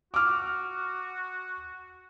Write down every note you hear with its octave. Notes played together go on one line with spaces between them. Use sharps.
F#4 D6 F6